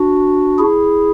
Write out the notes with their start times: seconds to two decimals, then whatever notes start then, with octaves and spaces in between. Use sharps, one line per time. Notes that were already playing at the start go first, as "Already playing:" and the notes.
Already playing: D4 F#4
0.58 E4 G#4